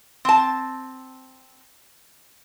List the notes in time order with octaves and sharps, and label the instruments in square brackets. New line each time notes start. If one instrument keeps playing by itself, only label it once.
[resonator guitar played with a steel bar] C4 A5